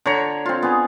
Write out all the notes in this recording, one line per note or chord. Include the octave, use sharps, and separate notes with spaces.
D3 C#5 A#5
C4 F4
B3 G#4